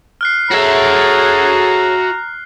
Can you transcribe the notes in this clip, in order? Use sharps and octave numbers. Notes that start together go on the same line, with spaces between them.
F6 F#6 C7
F#4 G#4 A4 C#5 E5 A#5